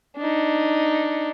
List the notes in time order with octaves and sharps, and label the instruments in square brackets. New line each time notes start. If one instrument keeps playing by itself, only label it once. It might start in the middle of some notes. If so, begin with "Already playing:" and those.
[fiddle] D4 D#4